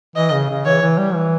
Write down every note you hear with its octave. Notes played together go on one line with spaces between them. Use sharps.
E3 D#5
C#3
C#3
E3 C#5
E3
G3
E3